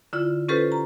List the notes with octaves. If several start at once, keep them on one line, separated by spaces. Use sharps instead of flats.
D3 E4 F4
C#4 F4 G4 A4 B4 C5
A#5